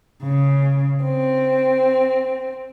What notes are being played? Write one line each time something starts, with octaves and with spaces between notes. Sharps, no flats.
C#3
C4